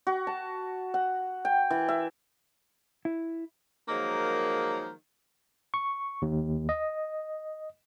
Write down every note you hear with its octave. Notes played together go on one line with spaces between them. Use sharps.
F#4
A5
F#5
G5
E3
E5
E4
D#3 F3 F#3 G#3 A#3
C#6
D#2
D#5